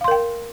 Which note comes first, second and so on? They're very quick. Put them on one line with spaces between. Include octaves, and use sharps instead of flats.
F5 C6 A#4 G5